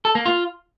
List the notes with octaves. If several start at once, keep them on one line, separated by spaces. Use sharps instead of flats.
A4
A#3
F4